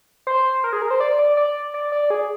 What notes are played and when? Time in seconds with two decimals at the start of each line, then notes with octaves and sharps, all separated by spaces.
0.27 C5
0.64 A#4
0.73 G#4
0.82 A#4
0.91 C5
1.00 D5
1.19 D5
1.37 D5
1.74 D5
1.92 D5
2.10 G#4